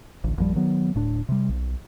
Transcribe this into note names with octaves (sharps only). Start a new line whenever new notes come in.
A1 D2
A#1 F#2 F3 G3
D#3 F#3 B3
D1 A2 D4
C3 G3
B1